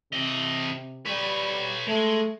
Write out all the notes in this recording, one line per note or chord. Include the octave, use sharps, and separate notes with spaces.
C3 C4 D#5
G3 B4 C#5
G#3 A3